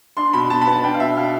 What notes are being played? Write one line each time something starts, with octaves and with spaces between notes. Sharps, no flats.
D4 C6
B2 B5
B2 A5
B5
B3
A5
D4 G5
F5
B2 E5
B2 F5